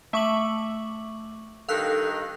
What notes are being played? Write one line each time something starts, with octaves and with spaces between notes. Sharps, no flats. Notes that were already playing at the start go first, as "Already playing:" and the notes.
A3 E5 C#6 D6 E6 F#7
G2 D#3 A4 F5 E6 F#6